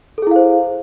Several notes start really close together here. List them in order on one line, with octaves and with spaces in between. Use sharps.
A4 G#4 E4 F5 C5